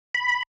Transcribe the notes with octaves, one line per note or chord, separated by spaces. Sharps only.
B5